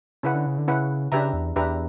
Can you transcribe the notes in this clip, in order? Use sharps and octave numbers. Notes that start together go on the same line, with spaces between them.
C#3 C#4 E4 B4 F#5
D3
C#3
D3
C#3 C#4 E4 B4 F#5
C#3 D4 G4 B4 E5 A#5
E2
E2 D4 G4 B4 E5 A#5